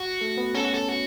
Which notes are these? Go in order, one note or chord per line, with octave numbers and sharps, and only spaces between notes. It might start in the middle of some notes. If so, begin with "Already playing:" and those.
Already playing: F#4
A3 A4
B3 B4
C#4 A4 C#5
F#4
A4
F#4